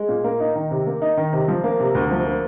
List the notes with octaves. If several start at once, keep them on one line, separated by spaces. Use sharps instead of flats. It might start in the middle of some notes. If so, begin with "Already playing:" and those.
Already playing: G#3
A#2
A#3
D#4
D#3
C3
A#3
D#4
D#3
C3
F3
A#3
C3
D2
F3
A#3